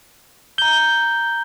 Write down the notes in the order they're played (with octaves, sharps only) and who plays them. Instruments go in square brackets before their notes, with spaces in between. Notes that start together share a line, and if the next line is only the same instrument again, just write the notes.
[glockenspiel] A#5 G6 G7